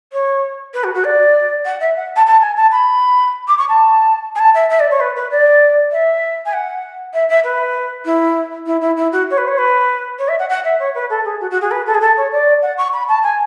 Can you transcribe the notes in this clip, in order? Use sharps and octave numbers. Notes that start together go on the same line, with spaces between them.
C#5
B4
F#4
F#4
D5
F#5
E5
F#5
A5
A5
G#5
A5
B5
D6
C#6
A5
G#5
A5
E5
E5
D5
C#5
B4
B4
D5
E5
G#5
F#5
E5
E5
B4
E4
E4
E4
E4
F#4
C#5
B4
C#5
B4
C#5
E5
F#5
F#5
E5
C#5
B4
A4
G#4
F#4
F#4
G#4
B4
A4
G#4
A4
C#5
D5
F#5
C#6
B5
A5
G#5